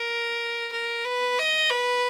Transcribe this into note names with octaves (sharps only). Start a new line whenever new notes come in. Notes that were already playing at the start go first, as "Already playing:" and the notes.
Already playing: A#4
A#4
B4
D#5
B4